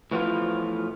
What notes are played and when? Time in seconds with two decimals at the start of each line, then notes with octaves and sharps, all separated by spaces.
0.11 A2 E3 F3 B3 F4